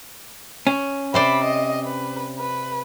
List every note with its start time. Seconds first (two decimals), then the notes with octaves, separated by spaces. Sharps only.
0.67 C#4
1.14 C3 C5 D5 B5
1.44 D#5
1.85 B4
2.38 B4